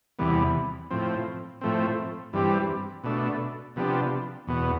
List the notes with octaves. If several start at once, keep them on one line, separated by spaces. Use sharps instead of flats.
E2 C3 E3 G3 B3
A2 F3 C4
A2 F3 A3 C4
G2 E3 G3 C4 G4
B2 A3 D4
C3 F3 B3 D4 G4
E2 B2 B3